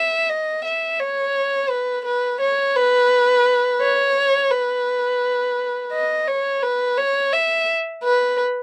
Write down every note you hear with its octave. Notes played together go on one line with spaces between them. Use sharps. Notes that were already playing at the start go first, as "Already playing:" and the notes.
Already playing: E5
D#5
E5
C#5
B4
B4
C#5
B4
C#5
B4
D#5
C#5
B4
C#5
E5
B4